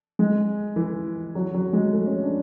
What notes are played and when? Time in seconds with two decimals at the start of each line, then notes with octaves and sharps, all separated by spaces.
0.19 G#3
0.76 E3
1.35 F#3
1.54 F#3
1.73 G#3
1.92 A3
2.07 C#4
2.22 D4